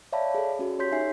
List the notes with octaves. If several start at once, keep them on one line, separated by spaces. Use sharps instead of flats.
C#5 D5 E5 F5 A5 B5
G#4 A4
C#4 F#4 A4
G4 C#5 C6 G6 B6
D#4 E5 G#5 C7